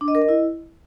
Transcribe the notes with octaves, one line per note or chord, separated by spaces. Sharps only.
D4
D#5
A#4
D#5
E4